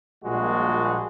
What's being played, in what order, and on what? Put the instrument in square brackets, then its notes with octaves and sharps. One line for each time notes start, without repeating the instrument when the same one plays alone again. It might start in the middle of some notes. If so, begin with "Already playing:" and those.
[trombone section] A#1 A#2 G3 G#3 F#4